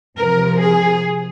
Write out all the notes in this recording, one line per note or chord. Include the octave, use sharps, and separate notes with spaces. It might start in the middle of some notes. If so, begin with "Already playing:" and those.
C3 F3 A#4
G#4